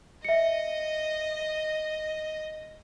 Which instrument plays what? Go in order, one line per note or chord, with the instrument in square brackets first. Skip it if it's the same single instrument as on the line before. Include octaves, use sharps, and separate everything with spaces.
[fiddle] D#5 [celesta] E5 C#7